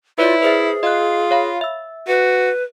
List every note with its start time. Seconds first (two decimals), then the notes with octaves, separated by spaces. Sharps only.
0.18 E4 F4 B4 C#5 D5
0.42 G#4 B4 C5 E5
0.83 F4 D#5 F#6
1.31 C#5 F5 B5
1.61 E5 E6
2.07 F#4 B4